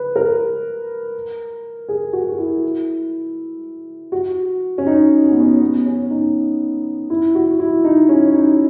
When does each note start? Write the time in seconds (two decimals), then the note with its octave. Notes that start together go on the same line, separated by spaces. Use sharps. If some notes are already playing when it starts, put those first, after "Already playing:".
Already playing: B4
0.16 A#4
1.89 G#4
2.13 F#4
2.32 F#4
2.38 E4
4.12 F#4
4.78 C#4
4.86 D#4
5.24 C#4
5.31 B3
5.40 C#4
5.61 B3
5.86 C#4
6.10 D#4
7.10 E4
7.35 F#4
7.60 E4
7.84 D#4
8.09 C#4
8.34 D#4